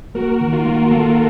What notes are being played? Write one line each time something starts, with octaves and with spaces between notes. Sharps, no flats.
A#3 F#4 A#4
D#3
F4
A#3
A#3 F4 A4